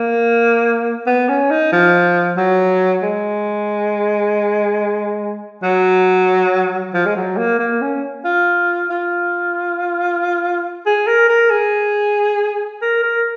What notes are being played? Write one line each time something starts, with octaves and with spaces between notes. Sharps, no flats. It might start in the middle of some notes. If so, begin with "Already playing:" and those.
Already playing: A#3
B3
C#4
D#4
F3
F#3
G#3
F#3
F3
G#3
F#3
A#3
A#3
C#4
F4
F4
G#4
A#4
A#4
G#4
A#4
A#4